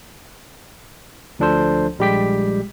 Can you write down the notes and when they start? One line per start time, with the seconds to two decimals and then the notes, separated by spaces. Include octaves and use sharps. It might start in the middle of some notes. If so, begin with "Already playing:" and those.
1.39 D2 F3 D4 A4 C5
1.99 A#1 G3 G#3 G4 G5 B6